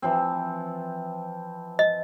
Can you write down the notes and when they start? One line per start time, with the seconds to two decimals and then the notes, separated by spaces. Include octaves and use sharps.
0.02 E3 F3 C4
1.79 D#5